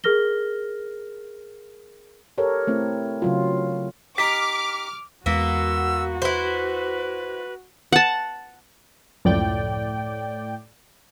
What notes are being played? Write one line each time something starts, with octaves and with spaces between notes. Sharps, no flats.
G#4 A#4 F6 A#6 G7
G4 A4 A#4 C#5
A3 C4 E4
C#3 F#3 F4
D#4 G4 D6 F6 B6
E2 G#3 A#3 B3 F#4 E6
E4 B4 C5
F#5 A5
C#2 F#2 A2 F3 D5 G5